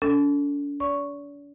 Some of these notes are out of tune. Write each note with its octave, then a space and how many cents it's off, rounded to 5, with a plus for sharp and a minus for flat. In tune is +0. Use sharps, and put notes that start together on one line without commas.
D4 -45 A4 +15
D5 -45 C#6 +0